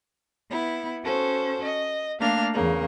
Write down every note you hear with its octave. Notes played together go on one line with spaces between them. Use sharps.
B3 E4
C#4 F#4 A4 C5
D#5
A3 A#3 D4 F5 F6
E2 C#3 A#3